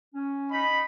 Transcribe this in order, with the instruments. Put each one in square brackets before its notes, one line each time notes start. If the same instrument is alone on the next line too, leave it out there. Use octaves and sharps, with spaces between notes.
[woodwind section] C#4
[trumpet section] D#4 B5